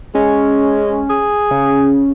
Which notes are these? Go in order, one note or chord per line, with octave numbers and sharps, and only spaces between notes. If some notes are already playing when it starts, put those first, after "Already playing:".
G#3 C#4
G#4
C#3